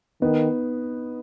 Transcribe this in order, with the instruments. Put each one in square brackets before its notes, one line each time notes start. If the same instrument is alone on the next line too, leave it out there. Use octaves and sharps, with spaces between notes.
[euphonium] D#3 [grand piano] B3 D#4